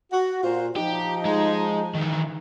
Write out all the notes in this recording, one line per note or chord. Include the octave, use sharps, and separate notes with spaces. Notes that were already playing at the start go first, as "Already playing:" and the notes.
F#4
A#2 F4 C5
F3 D#4 G4
G#3
D#3 E3